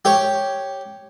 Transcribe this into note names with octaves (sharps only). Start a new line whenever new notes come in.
G4 C#5